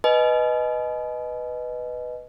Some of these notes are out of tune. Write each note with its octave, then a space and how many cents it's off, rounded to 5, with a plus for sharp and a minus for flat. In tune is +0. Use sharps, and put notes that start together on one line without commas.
B4 +0 D#5 +0 G#5 +40